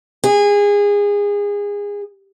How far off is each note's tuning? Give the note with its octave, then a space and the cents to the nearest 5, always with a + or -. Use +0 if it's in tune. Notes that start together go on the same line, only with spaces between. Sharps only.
G#4 -25